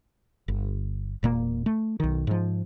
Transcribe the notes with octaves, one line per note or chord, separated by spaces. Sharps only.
G1
E1 A#2 A#3
A3
B1 D#3
G#2 F3